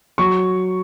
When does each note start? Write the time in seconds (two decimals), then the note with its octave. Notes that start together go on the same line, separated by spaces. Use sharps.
0.18 F#3 C#6